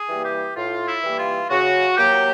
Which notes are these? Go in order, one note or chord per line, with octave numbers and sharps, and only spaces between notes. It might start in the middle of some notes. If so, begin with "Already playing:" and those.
Already playing: G#4
E3 G3 A#3
G4
A2 F4
E4
E3 G3 A#3
F4
C#3 F#4
F#3 A#3 G4